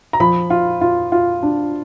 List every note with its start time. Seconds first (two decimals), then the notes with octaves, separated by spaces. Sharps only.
0.13 A#5
0.20 F3 B5
0.50 F4
0.81 F4
1.12 F4
1.43 D4